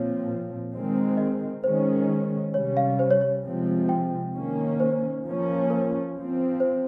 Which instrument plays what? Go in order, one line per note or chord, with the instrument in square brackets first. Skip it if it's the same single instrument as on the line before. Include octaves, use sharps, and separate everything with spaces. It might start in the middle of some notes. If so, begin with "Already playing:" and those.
Already playing: [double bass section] A#2 F3 C4 [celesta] C#5
[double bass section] D#3 G#3 C4
[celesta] D#5
[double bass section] D#3 G#3 C#4 [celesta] C5
[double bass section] C3 G3 C#4 [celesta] C#5
[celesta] F5
C5
C#5
C#5
[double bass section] C3 F3 G#3 C4
[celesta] G5
[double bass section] D#3 A#3 C#4
[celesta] C5
[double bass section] F3 A#3 C#4
[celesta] A#4
[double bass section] F3 C4
[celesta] C5